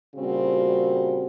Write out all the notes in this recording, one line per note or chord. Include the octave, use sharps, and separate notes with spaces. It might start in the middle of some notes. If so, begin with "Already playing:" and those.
A#2 C#3 G3 C4 F#4